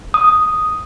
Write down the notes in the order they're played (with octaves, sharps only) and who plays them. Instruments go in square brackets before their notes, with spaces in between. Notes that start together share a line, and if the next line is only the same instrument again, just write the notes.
[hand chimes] D#6